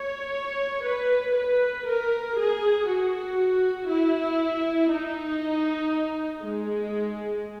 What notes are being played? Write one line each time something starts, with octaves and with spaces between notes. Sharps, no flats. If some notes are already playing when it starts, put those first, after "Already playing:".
Already playing: C#5
B4
B4
A#4
G#4
F#4
E4
D#4
G#3